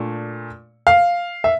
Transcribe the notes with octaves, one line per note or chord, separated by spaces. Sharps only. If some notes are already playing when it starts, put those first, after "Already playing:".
Already playing: A#2 A3 D4
F5
E5